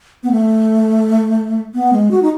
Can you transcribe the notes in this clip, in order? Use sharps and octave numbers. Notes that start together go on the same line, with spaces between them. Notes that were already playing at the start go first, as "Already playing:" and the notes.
B3
A3
B3
G#3
F#4
D#4